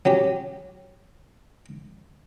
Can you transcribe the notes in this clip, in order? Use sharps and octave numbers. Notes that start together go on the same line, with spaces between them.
F#3 C#4 G4